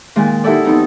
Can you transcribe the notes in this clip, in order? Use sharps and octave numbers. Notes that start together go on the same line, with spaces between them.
A#2 D#3 G#3
D#4 E4 F#4 G4 A4 D5
F2 B3 D#4